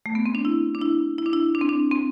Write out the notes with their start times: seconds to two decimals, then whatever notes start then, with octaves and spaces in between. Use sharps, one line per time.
0.06 A3
0.15 B3
0.26 C4
0.35 D4
0.45 E4
0.75 D4
0.81 E4
1.18 E4
1.26 D4
1.33 E4
1.55 D4
1.61 C4
1.69 D4
1.91 C4